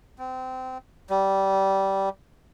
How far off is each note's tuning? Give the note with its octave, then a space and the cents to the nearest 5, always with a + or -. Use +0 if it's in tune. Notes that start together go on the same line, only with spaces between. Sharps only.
C4 -25
G3 -15